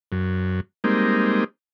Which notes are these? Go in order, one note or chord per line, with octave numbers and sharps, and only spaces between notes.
F#2
G3 G#3 A#3 C4 D#4